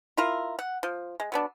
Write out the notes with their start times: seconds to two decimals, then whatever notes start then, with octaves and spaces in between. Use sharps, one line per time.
0.17 E4 F4 A#4
0.59 F#5
0.83 F3
1.20 G#3
1.32 F#3 B3 D4